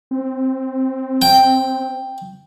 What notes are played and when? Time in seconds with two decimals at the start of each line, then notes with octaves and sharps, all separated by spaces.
0.11 C4
1.22 G5